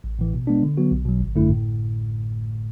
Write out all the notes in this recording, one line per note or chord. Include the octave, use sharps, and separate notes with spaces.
A1
A2 E3
B2
G#3 B3 D4
D3
F#3 B3 F#4
B1
B2 F#3
G#1
F#2 D3 A3 E4
A2